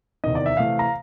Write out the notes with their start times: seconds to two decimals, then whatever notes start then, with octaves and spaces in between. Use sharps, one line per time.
0.24 E2 C3 D#3 D#5
0.35 D5
0.46 E5
0.57 C3 E3 A3 F5
0.79 A#5